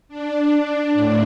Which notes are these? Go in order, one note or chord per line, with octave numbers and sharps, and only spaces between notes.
D4
A2